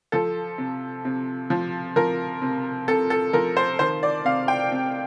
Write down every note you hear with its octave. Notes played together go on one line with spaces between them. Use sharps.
F3 A4
C3
C3
F3
F3 A#4
C3
C3 A4
A4
F3 A#4
C5
D#3 C5
D5
C3 F5
G5
C3